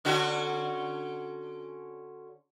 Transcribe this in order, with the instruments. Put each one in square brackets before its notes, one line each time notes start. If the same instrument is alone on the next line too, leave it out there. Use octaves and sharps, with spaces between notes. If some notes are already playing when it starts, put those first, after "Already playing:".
[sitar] D3 C#4 F#4